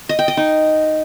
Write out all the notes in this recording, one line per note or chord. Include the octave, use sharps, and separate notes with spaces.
D#5
G5
D#5
D#4